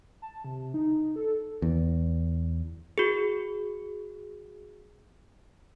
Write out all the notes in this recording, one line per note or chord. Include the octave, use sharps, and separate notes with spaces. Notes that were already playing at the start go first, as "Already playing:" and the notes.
A5
C3
D#4
A4
E2
F#4 G#4